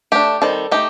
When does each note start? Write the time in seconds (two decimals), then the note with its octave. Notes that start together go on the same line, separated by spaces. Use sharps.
0.12 A3 D4 G4
0.41 D#3 G3 C4 A4
0.71 A3 D#4 G4